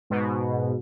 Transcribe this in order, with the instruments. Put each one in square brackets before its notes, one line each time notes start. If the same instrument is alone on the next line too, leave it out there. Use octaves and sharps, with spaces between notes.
[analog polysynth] G#2 B2